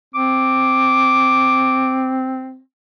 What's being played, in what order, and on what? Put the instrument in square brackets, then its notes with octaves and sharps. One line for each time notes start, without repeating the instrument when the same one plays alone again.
[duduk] C4 [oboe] D6